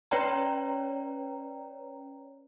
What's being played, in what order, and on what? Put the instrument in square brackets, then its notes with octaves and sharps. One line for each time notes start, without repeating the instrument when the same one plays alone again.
[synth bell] C#4 B4 C#5 D5 G5 A#5